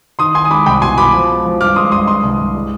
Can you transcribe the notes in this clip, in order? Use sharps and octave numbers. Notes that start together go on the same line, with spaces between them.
D#3 C6 D#6
D#3 G#5 C6
D#6
G#3 B5 D6
C2 G5 B5
B2 G#5 C6
B2 B5 D6
F3
G#3
F3
G2 D6 F6
G#3 C6 D#6
G2 C6 D#6
G#3 C6 D#6
C2
C2
G#3